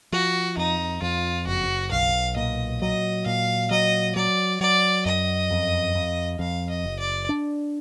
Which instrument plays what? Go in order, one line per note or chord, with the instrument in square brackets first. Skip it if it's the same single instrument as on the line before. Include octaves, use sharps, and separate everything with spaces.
[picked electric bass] F3 [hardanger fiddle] F#4
[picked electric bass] F2 [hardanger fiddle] D#4
[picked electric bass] F2 [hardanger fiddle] F4
[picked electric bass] F#1 [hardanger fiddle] F#4
[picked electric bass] B1 [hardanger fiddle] F5
[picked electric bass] A#2 [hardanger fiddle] D#5
[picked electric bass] F#3 [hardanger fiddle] D#5
[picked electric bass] A#2 [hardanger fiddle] F5
[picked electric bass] F#3 [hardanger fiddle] D#5
[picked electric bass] F#3 [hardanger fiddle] D5
[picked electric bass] F#3 [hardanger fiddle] D5
[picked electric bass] F#2 [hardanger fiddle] D#5
[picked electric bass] F2
F2
[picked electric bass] F2 [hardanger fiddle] F5
[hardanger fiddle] D#5
[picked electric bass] F#1
[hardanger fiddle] D5
[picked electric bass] D4